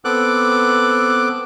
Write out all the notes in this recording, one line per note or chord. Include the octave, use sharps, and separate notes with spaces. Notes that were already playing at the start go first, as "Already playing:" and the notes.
B3 C4 A4 D6 F#6